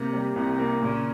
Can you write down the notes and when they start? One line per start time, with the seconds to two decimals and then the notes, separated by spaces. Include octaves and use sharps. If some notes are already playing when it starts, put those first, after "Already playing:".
Already playing: C3 A#3
0.13 G3
0.36 C2 C3
0.59 A#3
0.81 A#2 C#3